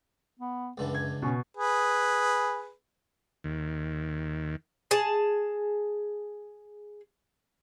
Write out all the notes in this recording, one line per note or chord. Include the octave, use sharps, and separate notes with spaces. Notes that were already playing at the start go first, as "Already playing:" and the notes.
B3
C#2 F#2 D3 E3
G#6
B2 C#4
G#4 B4
D#2
G#4 A5